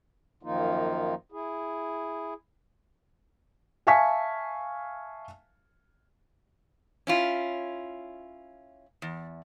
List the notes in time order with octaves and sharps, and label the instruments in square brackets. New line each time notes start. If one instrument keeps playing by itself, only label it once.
[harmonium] F#2 D#3 F3 A#3 D#4 F4
E4 G#4
[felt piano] E5 F5 G#5 A5 C#6 B6
[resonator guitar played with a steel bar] C#4 E4 F4
E2